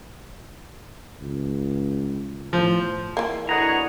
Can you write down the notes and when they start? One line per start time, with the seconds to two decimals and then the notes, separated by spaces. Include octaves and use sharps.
1.21 C#2
2.53 A2 F3
3.17 E3 A#3
3.49 B2 D3 E4 G#4 C#5 F#5 A#5